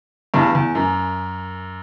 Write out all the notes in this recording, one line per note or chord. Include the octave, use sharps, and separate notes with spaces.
E2 G2
E2
F#2